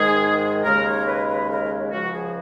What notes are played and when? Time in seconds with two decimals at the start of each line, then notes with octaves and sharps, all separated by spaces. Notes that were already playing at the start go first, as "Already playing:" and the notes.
Already playing: G#2 D#3 G#3 G#4
0.64 D#2 C#3 G#3 A#4
0.86 C#5
1.07 B4
1.28 B4
1.50 A#4
1.92 C#2 C#3 F3 F#4
2.13 G#4